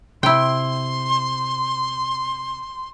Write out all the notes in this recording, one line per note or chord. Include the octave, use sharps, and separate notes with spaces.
C3 E4 G5 C6